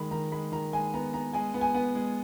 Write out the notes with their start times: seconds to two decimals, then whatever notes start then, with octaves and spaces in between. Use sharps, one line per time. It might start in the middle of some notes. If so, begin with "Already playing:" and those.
Already playing: D#3 G#3 B5
0.11 D#3 A#5
0.32 G#3 B5
0.52 D#3 A#5
0.73 G#3 G#5
0.94 B3 A#5
1.13 B3 A#5
1.33 G#3 G#5
1.54 B3
1.61 G#5
1.74 B3
1.95 G#3